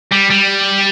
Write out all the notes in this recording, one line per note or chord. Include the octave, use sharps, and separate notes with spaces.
G3
G3